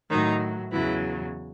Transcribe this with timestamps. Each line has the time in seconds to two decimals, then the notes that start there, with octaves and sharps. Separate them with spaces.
0.09 A2 D#3 F#3 D#4
0.71 E2 C#3 E3 F#3 E4